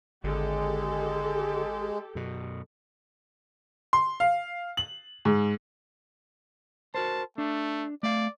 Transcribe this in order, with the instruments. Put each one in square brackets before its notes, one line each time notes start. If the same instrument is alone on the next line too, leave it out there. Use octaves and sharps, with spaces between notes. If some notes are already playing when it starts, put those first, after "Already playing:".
[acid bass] G#1 [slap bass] D3 [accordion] G#3 [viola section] G4 A4
[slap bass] F#2 B2
[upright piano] C6
F5
F#7
G#2
[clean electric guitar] F#4 A#4 C5 [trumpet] A5
[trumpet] A3 [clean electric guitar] D4
[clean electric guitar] A3 F5 [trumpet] D5